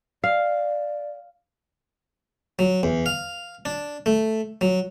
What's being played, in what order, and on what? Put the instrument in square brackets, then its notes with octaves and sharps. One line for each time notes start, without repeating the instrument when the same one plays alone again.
[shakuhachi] D5 [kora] F5
[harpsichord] F#3
E2
F5
D4
A3
F#3